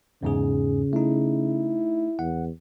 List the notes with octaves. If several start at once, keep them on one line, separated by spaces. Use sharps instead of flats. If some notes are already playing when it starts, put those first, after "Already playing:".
E2 G#2 C#3 G#4
A3 D#4 E4
E2 F#5